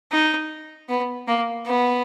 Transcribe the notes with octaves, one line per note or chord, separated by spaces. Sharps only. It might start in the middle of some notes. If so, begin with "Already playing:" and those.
D#4
B3
A#3
B3